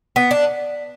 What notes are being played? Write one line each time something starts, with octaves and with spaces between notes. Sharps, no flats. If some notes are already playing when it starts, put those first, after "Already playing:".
B3
D4